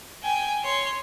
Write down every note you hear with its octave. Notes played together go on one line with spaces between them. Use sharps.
G5 G#5
C#5 C6